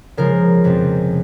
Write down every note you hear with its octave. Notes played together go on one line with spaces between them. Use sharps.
C#3 F3 G#3 A#4
F2 C3 F3 C4